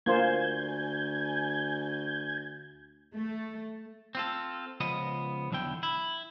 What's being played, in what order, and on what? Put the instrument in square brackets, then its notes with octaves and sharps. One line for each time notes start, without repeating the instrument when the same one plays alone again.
[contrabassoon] D2 [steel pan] A#3 F4 C5 [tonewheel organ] G#5 G6 G#6
[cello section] A3
[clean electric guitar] C4 F4 A4
C#2 F3 B3 D#5
B1 E2 D3 E4 G5
E4